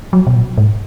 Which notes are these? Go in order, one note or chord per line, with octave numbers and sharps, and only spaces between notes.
F#3
B2
A#2
G#2